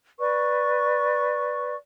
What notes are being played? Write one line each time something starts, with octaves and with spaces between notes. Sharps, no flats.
B4 D5 C#6